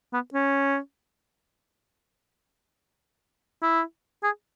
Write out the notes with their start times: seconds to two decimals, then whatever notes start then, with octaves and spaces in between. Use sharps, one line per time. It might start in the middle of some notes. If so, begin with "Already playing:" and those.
0.13 B3
0.34 C#4
3.62 E4
4.23 G#4